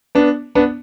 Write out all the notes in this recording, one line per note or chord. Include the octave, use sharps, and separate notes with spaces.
B3 D4
B3 D4